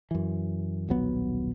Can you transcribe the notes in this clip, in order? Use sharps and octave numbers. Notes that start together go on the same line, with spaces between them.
F#2 E3
D#1 B1 F#3 B3